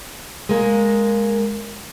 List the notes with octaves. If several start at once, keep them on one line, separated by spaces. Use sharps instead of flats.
G#3 A#3